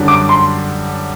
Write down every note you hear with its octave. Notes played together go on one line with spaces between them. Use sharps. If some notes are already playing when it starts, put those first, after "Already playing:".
Already playing: F#2 D3 G3 D4 F#4
D6
C6